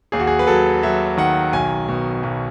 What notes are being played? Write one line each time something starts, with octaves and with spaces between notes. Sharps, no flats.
D#2 G#4
F#4
G#4
B4
F#3 A4
F#3 E5
D#3 F#5
B1 G#5
B2
B1